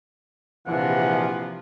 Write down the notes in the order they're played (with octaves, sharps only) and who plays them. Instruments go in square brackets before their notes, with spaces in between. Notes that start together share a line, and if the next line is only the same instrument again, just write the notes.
[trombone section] A#1 E3 [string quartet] C3 F3 [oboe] F#5